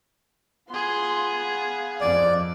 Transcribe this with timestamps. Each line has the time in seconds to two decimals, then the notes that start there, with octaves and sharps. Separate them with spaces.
0.70 B3 F4 G#4 C6
1.44 F5
2.01 F2 F3 D5